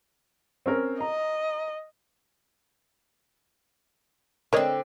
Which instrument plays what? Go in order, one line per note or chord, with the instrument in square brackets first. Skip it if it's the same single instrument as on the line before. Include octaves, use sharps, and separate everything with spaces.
[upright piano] C4 C#4 A#4
[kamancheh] D#5 [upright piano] A#5
[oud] D3 C4 [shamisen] A#4 C#5 D#5